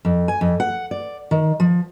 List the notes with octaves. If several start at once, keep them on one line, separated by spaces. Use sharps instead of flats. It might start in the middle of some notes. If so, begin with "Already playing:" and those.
F2
G#5
F2
F#5
D5
D#3
F3